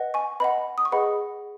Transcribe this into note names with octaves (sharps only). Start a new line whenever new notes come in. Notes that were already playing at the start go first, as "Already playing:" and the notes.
Already playing: B4 D#5 F#5
G#5 C#6
B4 D#5 F#5 B5
D#6
C#6
G#4 B4 D#5 F#5 B5